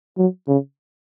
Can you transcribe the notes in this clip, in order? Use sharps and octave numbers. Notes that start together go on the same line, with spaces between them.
F#3
C#3